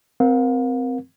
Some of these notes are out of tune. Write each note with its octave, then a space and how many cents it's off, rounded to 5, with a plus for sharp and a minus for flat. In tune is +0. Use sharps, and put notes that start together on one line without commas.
C4 -15 A#4 +15 F5 +40